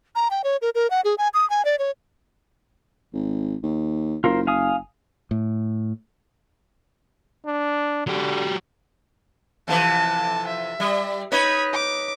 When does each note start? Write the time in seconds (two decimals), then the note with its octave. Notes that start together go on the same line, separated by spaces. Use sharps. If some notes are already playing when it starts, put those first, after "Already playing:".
0.15 A#5
0.31 G5
0.44 C#5
0.62 A#4
0.75 A#4
0.90 F#5
1.04 G#4
1.18 G#5
1.34 D#6
1.50 G#5
1.65 D5
1.79 C#5
3.13 G#1
3.63 D#2
4.24 F#1 F4 A#4 C5
4.47 F5 G#5 D#6
5.31 A2
7.46 D4
8.07 D3 F#3 G4
9.68 F2 C3 E3 A5
10.47 E5
10.80 G3
11.32 D#4 B4 C#5 B5 G#6
11.73 D6